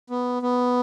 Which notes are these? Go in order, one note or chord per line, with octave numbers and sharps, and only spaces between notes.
B3
B3